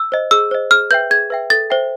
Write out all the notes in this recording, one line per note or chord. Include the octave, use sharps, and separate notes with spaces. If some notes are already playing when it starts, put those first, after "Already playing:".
Already playing: E6
C5 D#5
G#4 E6
C5 D#5
G#4 F6
B4 E5 G5 G6
G#4 G#6
B4 E5 G5
A4 A6
C5 E5 G5